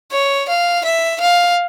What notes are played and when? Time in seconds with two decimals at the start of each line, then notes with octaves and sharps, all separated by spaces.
0.12 C#5
0.49 F5
0.84 E5
1.20 F5